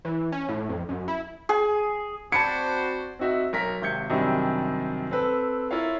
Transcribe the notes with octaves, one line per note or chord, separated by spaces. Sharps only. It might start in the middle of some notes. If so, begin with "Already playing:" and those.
E3
C#4
A2
F2
F#2
E4
G#4
C4 F#4 C5 D5 A5 B5 G#6 C#7
C4 D#4 F#4 E5 F#5
B1 A#4 A#6 B6
G#1 C3 G6 G#6 C#7
F#2 C3 D#3 G3 C4 D4
C4 A4 B4
E4 F4 A#4 C#5 F5